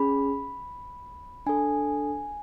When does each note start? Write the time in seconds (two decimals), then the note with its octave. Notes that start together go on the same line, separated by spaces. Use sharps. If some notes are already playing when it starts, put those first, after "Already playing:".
Already playing: C#4 G#4 B5
1.46 D4 A4 G#5